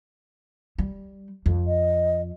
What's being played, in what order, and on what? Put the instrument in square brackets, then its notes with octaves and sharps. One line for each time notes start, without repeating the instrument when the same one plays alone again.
[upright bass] G3
F2
[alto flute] D#5